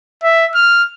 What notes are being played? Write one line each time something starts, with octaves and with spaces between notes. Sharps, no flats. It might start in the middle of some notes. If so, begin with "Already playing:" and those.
E5
F6